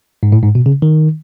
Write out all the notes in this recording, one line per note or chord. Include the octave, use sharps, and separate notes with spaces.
G#2
A2
G#2
B2
C#3
D#3